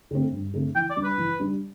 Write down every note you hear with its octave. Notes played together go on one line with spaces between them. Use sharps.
D3 A3 C4
G2
D3 A3 C4
E3 G5
D5
G3 D4
B4
E3
G3 D4